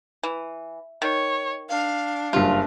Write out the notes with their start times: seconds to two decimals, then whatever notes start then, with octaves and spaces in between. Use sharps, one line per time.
0.23 E3
1.02 D#3 C#5
1.69 D4 F5
2.33 F#1 G2 F4